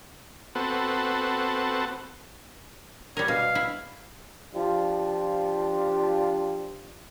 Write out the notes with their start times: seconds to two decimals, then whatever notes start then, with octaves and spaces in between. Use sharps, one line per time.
0.55 B3 C4 F#4 A4
3.17 G3 A#4 C#5
3.28 B2 F5
3.55 E4
4.54 F3 D4 F4 G4